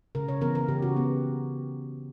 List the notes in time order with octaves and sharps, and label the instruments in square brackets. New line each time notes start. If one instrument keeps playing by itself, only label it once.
[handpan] C#3 A#4
C#5
E3 B3 A#4
A#4
C#3 G4
F#4
B3